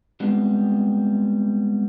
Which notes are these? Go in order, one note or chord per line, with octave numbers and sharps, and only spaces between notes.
G3 G#3 B3 C4 F4